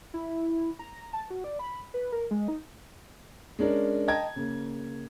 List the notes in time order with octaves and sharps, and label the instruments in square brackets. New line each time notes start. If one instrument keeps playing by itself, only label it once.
[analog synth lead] E4
A#5
A5
F#4
D5
B5
B4
A#4
G#3
D#4
[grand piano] G#3 C#4 D4 A#4
D#5 G5 A5 A#5 G#6
C#3 A#3